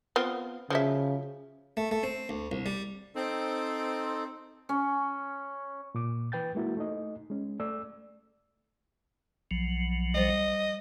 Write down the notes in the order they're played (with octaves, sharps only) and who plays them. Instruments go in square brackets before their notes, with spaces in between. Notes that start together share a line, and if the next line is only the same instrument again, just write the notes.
[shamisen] B3 C4 F4
[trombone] C#3 [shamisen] F3 F#3 E5
[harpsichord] A3
A3
C4
D2
C2
G3
[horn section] C4 [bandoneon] D#4 A4
[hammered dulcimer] C#4
[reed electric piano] A#2 D6
E3 B4 G5 G6 A6
G#3 A#3 E4 F#4
A3 D#4 D#5
G#3 C#4
A3 D5 E6
[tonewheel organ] B1 F3 F#3
[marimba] G3 C5 A6 [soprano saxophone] D#5